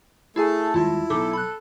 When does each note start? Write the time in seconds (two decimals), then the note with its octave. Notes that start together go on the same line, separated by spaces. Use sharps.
0.36 A3 E4 G#4 A4 G#5
0.74 D#2 G3 G#3 E4 F4 A5
1.10 B1 B2 D#4 A4 D6
1.33 B5 F#6